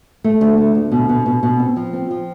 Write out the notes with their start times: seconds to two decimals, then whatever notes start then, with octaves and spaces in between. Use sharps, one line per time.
0.24 A3
0.41 D2
0.58 A3
0.75 D2
0.92 B2
1.09 B2
1.26 B2
1.43 B2
1.59 C4
1.76 F3
1.93 C4
2.11 F3